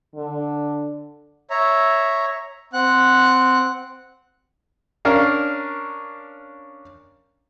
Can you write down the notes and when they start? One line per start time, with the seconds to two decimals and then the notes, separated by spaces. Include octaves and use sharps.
0.15 D3
1.50 C#5 E5 A#5
2.73 C4 F#5 F#6
5.05 C#4 D4 A#4 F5